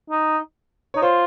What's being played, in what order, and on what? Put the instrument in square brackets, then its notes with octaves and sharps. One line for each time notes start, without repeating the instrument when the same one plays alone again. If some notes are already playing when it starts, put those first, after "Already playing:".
[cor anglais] D#4
[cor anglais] D#4 [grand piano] C#5
[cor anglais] F4 [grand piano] C5